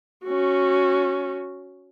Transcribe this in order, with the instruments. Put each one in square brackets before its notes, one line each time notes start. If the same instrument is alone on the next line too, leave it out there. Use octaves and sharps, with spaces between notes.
[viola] C#4 F#4